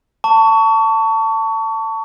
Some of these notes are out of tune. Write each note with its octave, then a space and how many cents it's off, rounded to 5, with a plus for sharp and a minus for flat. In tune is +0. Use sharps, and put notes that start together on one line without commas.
A5 +20 C#6 +25